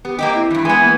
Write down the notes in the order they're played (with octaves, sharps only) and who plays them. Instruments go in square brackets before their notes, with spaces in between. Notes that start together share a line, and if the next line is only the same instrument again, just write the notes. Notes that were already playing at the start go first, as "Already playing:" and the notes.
[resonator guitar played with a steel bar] B3 [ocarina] G4
[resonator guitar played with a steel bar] A#3 C4 G4 [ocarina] D#5
[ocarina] E4
[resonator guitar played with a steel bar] G2 E3
[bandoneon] E3 G#5 [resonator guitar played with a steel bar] G#3 B3
[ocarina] A#3